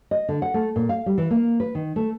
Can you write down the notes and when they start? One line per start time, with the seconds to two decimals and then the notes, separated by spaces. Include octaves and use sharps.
0.11 D#5
0.29 D3
0.42 F#5
0.54 A3
0.76 A#2
0.89 F5
1.06 G3
1.18 E3
1.30 A#3
1.60 B4
1.75 D#3
1.96 A3